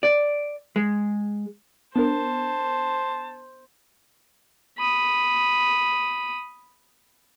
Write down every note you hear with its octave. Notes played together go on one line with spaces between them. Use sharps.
D5
G#3
B3 D4 A#4 C5 A5
B5 D#6